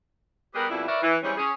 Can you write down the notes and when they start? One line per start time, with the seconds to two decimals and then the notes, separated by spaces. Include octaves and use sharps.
0.55 G3 B3 G4 G#4 A#4 B4
0.70 F2 B2 G3 E4
0.87 A#4 B4 C#5 D5 E5
1.03 E3
1.23 E3 G3 G#3 C4 C#4
1.37 C#4 G#4